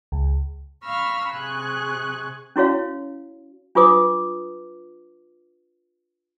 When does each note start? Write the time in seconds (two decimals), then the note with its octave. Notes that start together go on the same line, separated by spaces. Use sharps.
0.12 C#2
0.83 F5 A#5 B5 C#6 E6 F6
1.33 C3 G#4 G#5 C#6 F#6
2.56 C#4 E4 F#4 C#5 F5
3.75 D4 F4 B4 D6 D#6